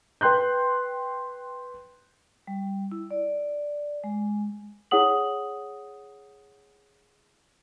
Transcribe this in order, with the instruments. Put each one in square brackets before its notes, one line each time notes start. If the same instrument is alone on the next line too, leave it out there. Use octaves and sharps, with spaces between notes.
[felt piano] B4 G5 C6 F#6 G6
[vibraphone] G3
E4
D5
G#3
[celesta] E4 G#4 C#5 F#5 D#6 F#7